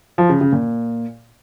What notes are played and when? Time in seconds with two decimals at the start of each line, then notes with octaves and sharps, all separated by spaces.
0.18 F3
0.29 C#3
0.41 C#3
0.52 A#2